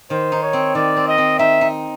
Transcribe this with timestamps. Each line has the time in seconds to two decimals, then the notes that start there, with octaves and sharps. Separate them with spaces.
0.10 D#3 C5
0.32 D#4
0.42 C#5
0.53 C4
0.75 D#3 D5
0.96 C4
1.08 D#5
1.18 C4
1.39 D#4 E5
1.61 D#4